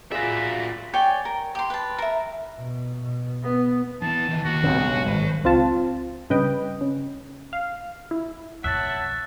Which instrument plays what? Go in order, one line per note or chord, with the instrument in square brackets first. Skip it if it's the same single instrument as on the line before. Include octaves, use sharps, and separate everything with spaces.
[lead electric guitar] F4 D5 [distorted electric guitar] F#4 E5 [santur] G#4 [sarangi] B5
[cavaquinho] C#5 D5 G5 G#5
A#4
G4 C6
B4 A5
A#4 E5
[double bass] B2
B2
B3
[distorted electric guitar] E3 B3 [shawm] A5
[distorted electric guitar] E3 D#4
[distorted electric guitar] D#2 [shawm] F#4
[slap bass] B1 G2 C#3 [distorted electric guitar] C4
[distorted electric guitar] G#3
[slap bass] G#1 [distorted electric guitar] C5 B5
[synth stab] C#2 C4 F4 A5
G2 C#3 B4 D#5 G5
C#3
F5
E4
[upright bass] B1 F2 [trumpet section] C#5 F#5 A5 [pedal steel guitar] E5 [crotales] F#6 A6